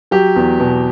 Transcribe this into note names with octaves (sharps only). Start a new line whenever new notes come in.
F#3 G4
E2
B2